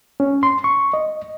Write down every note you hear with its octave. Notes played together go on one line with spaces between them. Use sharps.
C#4
C6
C#6
D#5